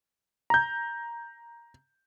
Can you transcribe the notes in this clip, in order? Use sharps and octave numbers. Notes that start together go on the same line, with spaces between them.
A#5 G6